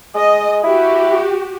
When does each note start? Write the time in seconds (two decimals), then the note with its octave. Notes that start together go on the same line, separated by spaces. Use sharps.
0.15 G#3 D#5
0.64 E4 F#4 G4